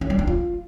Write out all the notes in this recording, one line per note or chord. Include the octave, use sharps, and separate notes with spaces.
C#4
G3
D4
F4